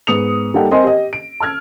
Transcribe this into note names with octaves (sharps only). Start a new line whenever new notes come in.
G#2 B3 D#6 C#7 F7
G3 A#3 D#4 A4 F#5 G5
C4 A#4 C5 D#5 G#5 C6
G4 D#5
D7
A5 E6 F6 G#6